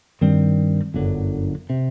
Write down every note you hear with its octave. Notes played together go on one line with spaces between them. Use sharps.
G2 D#3 G3 C4
G1 F#2 D3 F#3
C3